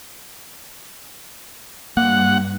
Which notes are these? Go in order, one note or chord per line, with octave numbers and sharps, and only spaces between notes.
G2 A#3 F#5